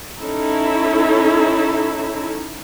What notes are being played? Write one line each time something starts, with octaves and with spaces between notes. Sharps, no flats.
C#4 D#4 E4 A4